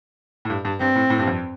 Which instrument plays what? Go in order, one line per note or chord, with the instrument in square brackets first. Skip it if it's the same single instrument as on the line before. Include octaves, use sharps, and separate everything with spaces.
[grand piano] A2
G2
G2
[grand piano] G2 [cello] C4
[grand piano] A2
A2
G2
F2